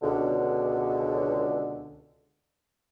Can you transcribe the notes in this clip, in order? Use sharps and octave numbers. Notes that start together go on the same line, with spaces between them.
C#2 B2 D3